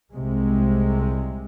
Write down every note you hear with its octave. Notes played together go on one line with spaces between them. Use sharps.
C2 C3 G#3